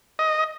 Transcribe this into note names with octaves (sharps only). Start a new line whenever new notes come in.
D#5